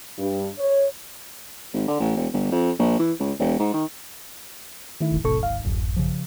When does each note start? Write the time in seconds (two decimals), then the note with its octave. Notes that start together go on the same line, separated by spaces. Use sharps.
0.19 G2
0.59 C#5
1.73 G#1
1.88 D3
2.00 A1
2.16 E1
2.33 G1
2.52 F2
2.79 A#1
2.99 E3
3.20 C#2
3.39 E1
3.59 G#2
3.74 D#3
5.01 D#3 A3 E4
5.12 D1 G#1
5.24 D1 G#1 G#2 B2 A4 C#6
5.43 F5
5.65 D1 A1 F#2
5.96 C#3 F3